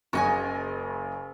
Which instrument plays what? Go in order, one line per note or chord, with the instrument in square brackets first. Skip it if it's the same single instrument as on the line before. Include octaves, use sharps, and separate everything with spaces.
[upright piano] F#1 C#3 [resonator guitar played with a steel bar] F#4 D#5 G#5